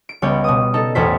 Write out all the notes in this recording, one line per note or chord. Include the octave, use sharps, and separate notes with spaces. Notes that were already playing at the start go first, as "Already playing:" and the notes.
D7
C#2 G3 B3 C#5 G6
B2 D#6
D#4 A4
A1 E2 A4 C5 B6